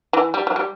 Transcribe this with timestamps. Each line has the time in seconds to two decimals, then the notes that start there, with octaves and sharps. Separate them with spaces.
0.13 E3
0.34 G3
0.47 F#3
0.56 G3